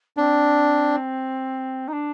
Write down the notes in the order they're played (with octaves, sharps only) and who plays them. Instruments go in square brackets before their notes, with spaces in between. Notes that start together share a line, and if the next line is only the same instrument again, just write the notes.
[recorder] C4 [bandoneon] D4
[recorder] D#4
D4